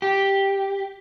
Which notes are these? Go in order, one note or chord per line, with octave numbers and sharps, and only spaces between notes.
G4